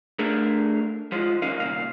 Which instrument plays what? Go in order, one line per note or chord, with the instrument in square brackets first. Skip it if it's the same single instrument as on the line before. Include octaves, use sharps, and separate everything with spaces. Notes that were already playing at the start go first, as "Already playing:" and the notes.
[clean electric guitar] A3 D4 G#4 A#4
F3 G#3 F4
F#2 D#3 C#4 A#4 F5
C2 A#2 F5